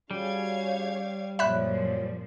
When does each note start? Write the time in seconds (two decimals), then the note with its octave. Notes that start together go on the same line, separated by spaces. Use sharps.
0.11 G3 C#4 F#4 G#4 C#5 F5 G#6
1.39 F#2 A#2 F3 C#5 E5 B5 F#6